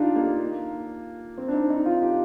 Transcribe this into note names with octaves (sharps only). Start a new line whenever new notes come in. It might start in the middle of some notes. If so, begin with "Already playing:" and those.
Already playing: D4 D#4 F4 G4
A#3
C4
D4
D#4
D#4
F4
G4